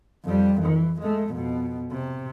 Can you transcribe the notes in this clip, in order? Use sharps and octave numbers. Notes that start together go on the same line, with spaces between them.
F2 G3
E3
G#3 A3
F2 B2
C3